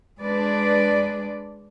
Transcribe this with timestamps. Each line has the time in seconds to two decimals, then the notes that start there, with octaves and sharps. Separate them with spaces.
0.21 G#3 D4 B4 D5